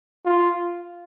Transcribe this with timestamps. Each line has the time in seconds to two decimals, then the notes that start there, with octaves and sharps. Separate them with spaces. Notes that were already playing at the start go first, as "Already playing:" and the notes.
0.25 F4